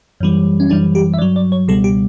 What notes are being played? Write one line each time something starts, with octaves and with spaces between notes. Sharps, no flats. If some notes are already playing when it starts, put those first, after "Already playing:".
F#2 E3 G3
C#4
F#2 E3 G3 D4
G4
E5
G2 F#3 D5
D5
C#5
C#2 B2 G3 A4
G4